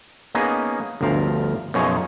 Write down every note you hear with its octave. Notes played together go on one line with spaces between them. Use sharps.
A#3 B3 C#4 D#4 G#4 D#5
G1 D2 F3 A#4 F5
F#2 B2 F3 D#4 G#4 C#5